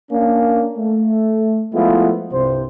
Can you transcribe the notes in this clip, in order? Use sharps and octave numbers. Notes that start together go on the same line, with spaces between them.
A#3 C#4 D4
A3
F3 G#3 A3 B3 E4 F4
C2 G2 C3 C5